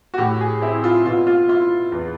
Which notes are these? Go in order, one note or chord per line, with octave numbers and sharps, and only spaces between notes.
F#4
A2 G4
G#4
C4 E4
F4
B2 F4
F4
E4 F4
E2